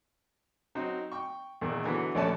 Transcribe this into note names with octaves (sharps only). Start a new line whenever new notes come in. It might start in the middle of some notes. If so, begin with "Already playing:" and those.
F#3 C4 D#4
G5 C#6
E2 A#2 D#3
D3 E3 F#3 B3
A#1 D#2 A3 C#4 D5 A5